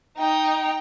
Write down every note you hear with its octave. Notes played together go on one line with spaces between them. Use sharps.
D#4 G5